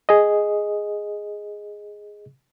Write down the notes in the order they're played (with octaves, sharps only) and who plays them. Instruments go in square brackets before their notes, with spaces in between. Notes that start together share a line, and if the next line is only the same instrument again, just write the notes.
[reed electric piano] G#4 D#5